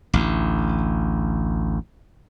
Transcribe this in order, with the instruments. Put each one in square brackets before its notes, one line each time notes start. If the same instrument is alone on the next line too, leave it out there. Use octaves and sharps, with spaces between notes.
[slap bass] A1 D2